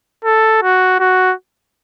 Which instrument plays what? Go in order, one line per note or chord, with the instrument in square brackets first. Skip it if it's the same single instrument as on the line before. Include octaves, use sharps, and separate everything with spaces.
[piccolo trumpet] A4
F#4
F#4